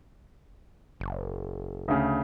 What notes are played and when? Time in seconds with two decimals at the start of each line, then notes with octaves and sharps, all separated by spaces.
1.00 F#1
1.88 D2 C#3